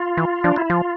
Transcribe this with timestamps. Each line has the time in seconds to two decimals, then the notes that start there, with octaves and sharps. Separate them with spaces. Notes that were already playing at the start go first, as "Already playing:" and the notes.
Already playing: F4
0.17 E3
0.44 F3 D4
0.56 E4
0.70 F3 F4